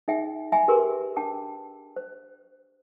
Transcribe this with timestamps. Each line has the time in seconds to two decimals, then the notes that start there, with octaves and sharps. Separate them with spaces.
0.08 D#4 G#4 E5 G5
0.52 E5 G5 G#5 A#5 B5
0.68 G4 G#4 A#4 B4 C6 D6
1.16 D4 G5 A5 D6
1.96 C5